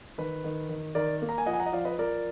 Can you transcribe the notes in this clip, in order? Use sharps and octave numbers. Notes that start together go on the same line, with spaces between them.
D#3 B4
D#3
D#3
D#3 A#4 D5
A#3
A#5
G#5
F3 D#5 F#5
G#5
F#5 A#5
D#5
F3 D5 F5
B4 D#5
F3 A#4 D5